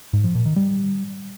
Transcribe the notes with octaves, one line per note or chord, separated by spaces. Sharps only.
G#2
F3
A#2
D#3
G3